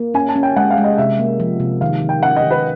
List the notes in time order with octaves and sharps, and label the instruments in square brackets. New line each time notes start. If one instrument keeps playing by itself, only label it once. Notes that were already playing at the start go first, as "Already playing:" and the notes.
Already playing: [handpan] A#3
[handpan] C#4 [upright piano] G#5
[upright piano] A5
[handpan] C#4
[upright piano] G5
[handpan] G#3 [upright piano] F#5
[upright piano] F5
[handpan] G#3
[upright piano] D#5
[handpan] C3 [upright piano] E5
[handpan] A#3
F3
C3
[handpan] D#3 [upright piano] F5
[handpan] D#3
[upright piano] G5
[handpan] C#4 [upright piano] F#5
[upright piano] D#5
[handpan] D#3
[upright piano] B4